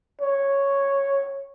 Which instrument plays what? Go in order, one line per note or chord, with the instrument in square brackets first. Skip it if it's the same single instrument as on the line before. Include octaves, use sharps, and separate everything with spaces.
[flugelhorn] C#5